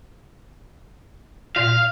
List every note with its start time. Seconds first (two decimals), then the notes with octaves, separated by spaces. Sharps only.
1.56 A#2 F5